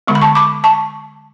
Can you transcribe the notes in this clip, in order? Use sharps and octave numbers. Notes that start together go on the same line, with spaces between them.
D3 G#3 B3 C#6
B5
A5 C#6
B5 D6
A5 C#6